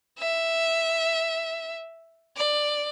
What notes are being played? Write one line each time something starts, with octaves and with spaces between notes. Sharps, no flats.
E5
D5